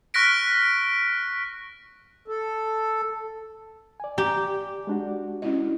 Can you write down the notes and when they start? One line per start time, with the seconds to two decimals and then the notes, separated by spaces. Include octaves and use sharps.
0.14 C#6 F6 F#6 A#6 B6 D7
2.28 A4
4.00 D5 G#5
4.18 G4 A#5
4.87 G#3 D4 F#4
5.42 C#4 E4 D#5